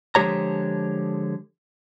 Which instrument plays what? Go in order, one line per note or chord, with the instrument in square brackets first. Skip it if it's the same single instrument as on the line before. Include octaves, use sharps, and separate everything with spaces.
[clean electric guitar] D3 F3 G#3 G4 C#5 A#5